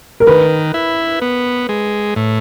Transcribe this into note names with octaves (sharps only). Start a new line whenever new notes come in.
A#4
D#3 B4
E4
B3
G#3
A2